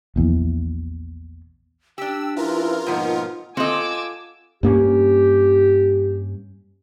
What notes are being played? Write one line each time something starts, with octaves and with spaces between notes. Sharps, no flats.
A#1 E2
D4 G4 G5 E6
F3 C#4 E4 F4 A#4 B4
G#2 B2 F3 A#3 D#4 F#5
C4 F4 A4 D#5 F#5 G#5 D6 E6
G2 A#3 C#4 G4